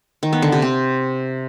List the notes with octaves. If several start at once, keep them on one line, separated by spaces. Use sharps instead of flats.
D#3
B3
D3
C3
C4